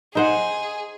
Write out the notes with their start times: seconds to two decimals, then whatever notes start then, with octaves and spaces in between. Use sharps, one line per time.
0.15 D#4 G#4 C5 F#5